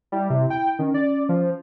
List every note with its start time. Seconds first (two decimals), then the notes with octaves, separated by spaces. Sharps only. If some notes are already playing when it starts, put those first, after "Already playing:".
0.12 G3 E4
0.30 C3
0.50 G5
0.79 D#3 C#4
0.94 D5
1.29 F3